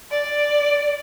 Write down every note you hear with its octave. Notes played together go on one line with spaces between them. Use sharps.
D5